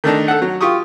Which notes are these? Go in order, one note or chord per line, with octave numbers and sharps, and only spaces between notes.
D#3 A3 D4 D#4
A4 F#5
F#3
F4 G4 C#6 D#6